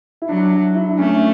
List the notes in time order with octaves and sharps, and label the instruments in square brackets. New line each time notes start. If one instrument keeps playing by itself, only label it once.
[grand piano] E4
[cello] F#3 [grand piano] D4
[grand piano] E4
D4
[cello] A3 [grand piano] C#4